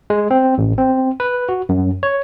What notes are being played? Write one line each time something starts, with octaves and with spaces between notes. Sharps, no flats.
G#3
C4
A1
C4
B4
F#4
F#2
C#5